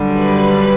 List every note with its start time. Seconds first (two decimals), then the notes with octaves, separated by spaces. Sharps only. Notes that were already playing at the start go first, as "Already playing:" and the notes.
Already playing: F#2 D3 G3
0.17 B4